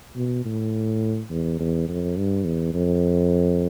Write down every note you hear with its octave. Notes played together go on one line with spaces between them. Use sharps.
B2
A2
E2
E2
F2
G2
E2
F2